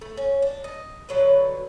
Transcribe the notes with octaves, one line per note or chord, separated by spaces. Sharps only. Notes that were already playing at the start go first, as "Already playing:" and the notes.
A3
C#4
D4
D#5
D3 F#3 B4